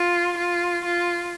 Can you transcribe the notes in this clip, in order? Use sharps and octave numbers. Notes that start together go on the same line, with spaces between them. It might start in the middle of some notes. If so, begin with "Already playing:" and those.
Already playing: F4
F4
F4